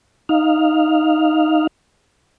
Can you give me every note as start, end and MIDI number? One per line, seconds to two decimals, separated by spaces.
0.29 1.67 63
0.29 1.67 77